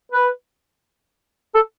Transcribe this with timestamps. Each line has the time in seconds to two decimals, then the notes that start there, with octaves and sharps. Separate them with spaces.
0.12 B4
1.55 A4